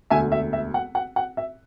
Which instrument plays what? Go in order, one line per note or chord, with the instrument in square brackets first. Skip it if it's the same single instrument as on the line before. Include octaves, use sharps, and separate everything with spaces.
[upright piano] E1 D2 D3 E5 G#5
E5
E5
F#5
F#5
F#5
E5